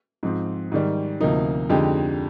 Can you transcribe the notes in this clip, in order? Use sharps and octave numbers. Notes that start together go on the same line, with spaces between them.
G#2 F3 C4
G#2 D#3 G3
D2 C3 F3 A#3 D#4
F2 D3 G#3 D#4 G4